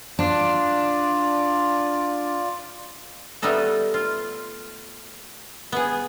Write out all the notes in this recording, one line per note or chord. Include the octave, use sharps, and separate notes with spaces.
D4 F4 D5
G3 A3 B3 D#4 A4
F4
B3 G#4